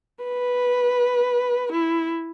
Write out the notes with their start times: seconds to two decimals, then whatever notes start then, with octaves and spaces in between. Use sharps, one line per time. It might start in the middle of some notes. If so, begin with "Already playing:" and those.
0.24 B4
1.73 E4